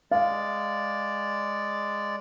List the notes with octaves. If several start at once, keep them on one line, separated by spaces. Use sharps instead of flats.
G#3 D5 F5